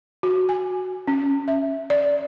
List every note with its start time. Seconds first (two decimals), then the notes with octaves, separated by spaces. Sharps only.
0.23 F#4
0.49 G#5
1.08 C#4
1.48 E5
1.90 D5